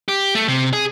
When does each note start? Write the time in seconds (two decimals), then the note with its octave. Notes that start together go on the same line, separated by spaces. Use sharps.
0.08 G4
0.35 A3
0.48 C3
0.73 G#4